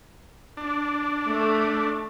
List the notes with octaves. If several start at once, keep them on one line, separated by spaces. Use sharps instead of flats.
D4
A3